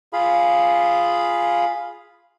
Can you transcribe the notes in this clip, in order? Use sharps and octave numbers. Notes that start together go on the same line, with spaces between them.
F4 G#4 F5 B5